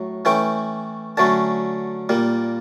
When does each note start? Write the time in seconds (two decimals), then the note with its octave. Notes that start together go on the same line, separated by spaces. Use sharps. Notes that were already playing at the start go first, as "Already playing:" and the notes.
Already playing: A2 F#3
0.25 E3 A3 C#4 E4 G5
1.17 D3 F#3 A3 C#4 A5
2.09 A#2 G3 A#3